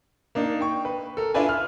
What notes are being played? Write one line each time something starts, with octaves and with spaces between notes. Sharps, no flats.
A#3 D4 D#4
G5 C#6
B4
A4 A#4
D4 E4 F4 B4 D5 G#5
F6